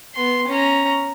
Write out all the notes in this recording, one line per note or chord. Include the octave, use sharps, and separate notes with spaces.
B3 C6
C#4 A#5